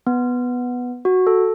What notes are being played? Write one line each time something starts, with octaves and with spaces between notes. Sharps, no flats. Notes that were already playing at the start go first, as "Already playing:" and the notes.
B3
F#4
A4